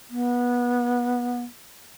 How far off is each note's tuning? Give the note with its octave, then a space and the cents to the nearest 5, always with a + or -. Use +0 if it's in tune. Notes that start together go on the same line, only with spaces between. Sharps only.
B3 -20